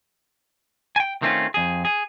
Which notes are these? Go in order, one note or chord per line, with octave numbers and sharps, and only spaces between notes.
G5 G#5
D#3 A3 C4 C#4 F4
F2 G#4
G#4